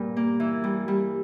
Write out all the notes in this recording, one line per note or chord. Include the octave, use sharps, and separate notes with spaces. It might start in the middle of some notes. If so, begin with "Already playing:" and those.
Already playing: G2 A#2 G3
A#3
E3
G3
G3